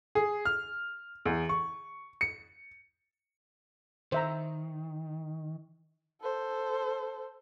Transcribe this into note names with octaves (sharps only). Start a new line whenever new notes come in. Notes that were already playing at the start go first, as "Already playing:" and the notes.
G#4
F6
E2
C#6
C#7
D#3 C5 E5 A#5
A4 C5